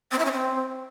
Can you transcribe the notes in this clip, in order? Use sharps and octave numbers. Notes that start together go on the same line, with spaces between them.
C4
E4
C#4
C4